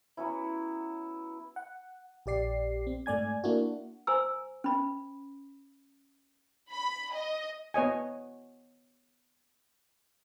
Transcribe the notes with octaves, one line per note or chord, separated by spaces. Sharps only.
F#3 B3 C#4 E4
F#5
A#1 G4 D5 C7
C4
G#2 A3 D5 G#5 G#6
A#3 D4 E4 F#4
C5 G#5 A#5 E6
C#4 B5
B5
D#5
B3 C#5 D#5 G#5